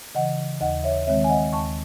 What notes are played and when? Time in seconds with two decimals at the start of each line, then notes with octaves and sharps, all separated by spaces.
0.15 C#3 E3 D#5 F#5
0.61 D#2 D#5 F#5
0.84 C#5 E5
1.07 D#3 G#3 C4 C#5 E5
1.24 G#5
1.30 D#5 F#5
1.53 D#2 A5 C#6